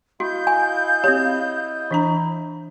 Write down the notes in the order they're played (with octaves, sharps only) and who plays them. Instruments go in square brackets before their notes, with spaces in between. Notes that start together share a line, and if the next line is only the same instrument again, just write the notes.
[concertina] E4 D#5 [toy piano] F#4 [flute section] F5 G6
[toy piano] G#5
[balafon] C4 G4 [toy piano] C#5
[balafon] E3 D4 A#5